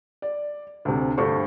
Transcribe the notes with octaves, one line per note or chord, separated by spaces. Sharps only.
D5
D2 C3
D2 G2 A3 C5 C#6